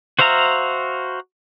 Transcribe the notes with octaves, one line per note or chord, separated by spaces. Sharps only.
F#4 C5 E5 F5 A#5